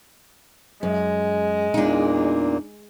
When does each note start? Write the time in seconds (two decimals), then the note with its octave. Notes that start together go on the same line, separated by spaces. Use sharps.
0.83 F#2 G#3
1.74 E2 A#2 A#3 D4 D#4